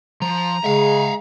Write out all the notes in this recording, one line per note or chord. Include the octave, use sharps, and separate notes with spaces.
F3 A#5
C#3 G#3 E5 F5